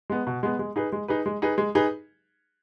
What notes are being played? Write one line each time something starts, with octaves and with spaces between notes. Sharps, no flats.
G#3 B3
B2
G#3 B3
G#3
D#4 G#4 B4
G#3
D#4 G#4 B4
G#3
D#4 G#4 B4
G#3
D#4 G#4 B4